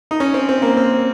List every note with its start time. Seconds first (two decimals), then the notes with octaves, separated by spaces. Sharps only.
0.11 D#4
0.20 C#4
0.34 C4
0.49 C4
0.62 A#3
0.77 C4